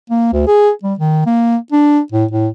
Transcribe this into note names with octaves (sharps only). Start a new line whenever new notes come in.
A#3
D2
G#4
G3
D#3
A#3
D4
A2
A2